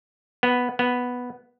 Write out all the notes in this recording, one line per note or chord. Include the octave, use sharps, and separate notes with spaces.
B3
B3